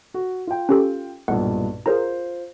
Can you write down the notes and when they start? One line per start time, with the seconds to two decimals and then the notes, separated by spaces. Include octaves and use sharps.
0.14 F#4
0.47 F4 G5
0.69 C#4 G4 A4
1.28 B1 G2 A#2 F#5
1.86 F4 G#4 A#4 C5 A#5